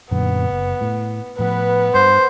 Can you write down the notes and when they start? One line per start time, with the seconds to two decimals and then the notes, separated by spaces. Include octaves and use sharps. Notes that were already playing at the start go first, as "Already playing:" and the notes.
0.11 F#2 A#2 D3 B3
0.50 F#1
0.81 A2
1.39 A2 F3 B3 B4
1.94 G2 C5